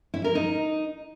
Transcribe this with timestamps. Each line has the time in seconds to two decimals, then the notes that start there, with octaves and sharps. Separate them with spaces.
0.14 E4
0.24 A#4
0.35 D#4